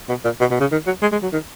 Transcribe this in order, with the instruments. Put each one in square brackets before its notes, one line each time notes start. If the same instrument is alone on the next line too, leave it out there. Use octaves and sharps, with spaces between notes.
[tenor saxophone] B2
A#2
B2
B2
C#3
D#3
F#3
G#3
G#3
F#3
D#3